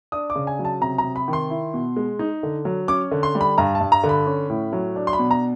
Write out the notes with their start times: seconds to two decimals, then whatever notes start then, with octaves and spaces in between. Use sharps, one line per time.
0.12 D4 D#6
0.30 D6
0.35 C#3
0.47 G#5
0.59 F#3
0.65 A5
0.81 C3 A#5
0.98 A#5
1.04 C3
1.16 B5
1.28 D#3
1.33 C6
1.50 E4
1.74 B2
1.96 G#3
2.19 D#4
2.43 D3
2.65 F#3
2.88 C#4 D6
3.11 D3
3.23 C6
3.35 G3
3.41 B5
3.58 G2 A#5
3.75 A5
3.81 G2
3.92 A#5
4.03 D3
4.09 B5
4.27 C#4
4.50 A2
4.73 F#3
4.96 D4
5.07 C6
5.13 B5
5.19 B2
5.31 A#5